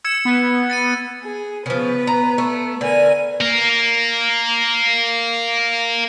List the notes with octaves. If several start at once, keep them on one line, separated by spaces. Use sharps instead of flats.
E6 G#6 C#7 E7
B3
A6 C#7 D#7
G#4
C#3 F3 B3 B4
A#5
A3
D3 A#4 B4 G#5
A#3 A#4